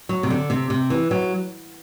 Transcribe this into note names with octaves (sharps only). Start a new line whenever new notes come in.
F#3
C3
D3
C3
C3
E3
F#3